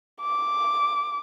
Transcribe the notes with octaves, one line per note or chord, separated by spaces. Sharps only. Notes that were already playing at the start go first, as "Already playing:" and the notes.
D6